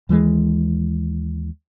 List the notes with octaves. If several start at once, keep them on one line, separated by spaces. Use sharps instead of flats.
D#2 E3 F#3 G#3